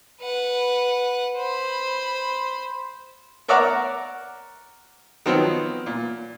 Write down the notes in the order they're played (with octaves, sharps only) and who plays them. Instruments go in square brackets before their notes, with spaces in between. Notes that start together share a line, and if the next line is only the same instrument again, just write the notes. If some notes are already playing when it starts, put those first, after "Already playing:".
[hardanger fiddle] B4 F#5
C5 B5
[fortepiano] A#4 C#5 D5 E5 F#5 A#5
D#3 F3 F#3 B3 C4
A#2